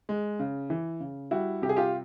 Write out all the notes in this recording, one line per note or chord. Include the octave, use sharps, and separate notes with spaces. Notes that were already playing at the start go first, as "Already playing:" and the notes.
G#3
C#3
E3
C#3
G3 E4 F#4
C3 G4
G#4
F4 G4